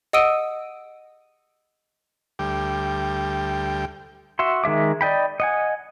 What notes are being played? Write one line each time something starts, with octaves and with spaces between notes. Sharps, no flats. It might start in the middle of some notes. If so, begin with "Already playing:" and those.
D#5 F#5 D#6 E6 D7 D#7
D2 G3 G5
F#4 E5 C6
D#3 G#3 E5 D6
D5 D#5 G5 B5
D#5 F#5 G#5